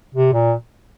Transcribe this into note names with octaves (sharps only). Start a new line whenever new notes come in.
C3
A#2